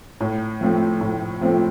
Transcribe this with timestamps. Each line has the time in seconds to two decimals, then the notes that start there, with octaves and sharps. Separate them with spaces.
0.21 A2
0.61 F3 A3 C4 F4
1.01 A2
1.41 F3 A3 C4 F4